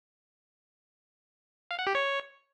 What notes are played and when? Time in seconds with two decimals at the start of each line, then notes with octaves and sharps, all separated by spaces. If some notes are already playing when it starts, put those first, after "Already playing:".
1.71 F5
1.79 F#5
1.87 G4
1.95 C#5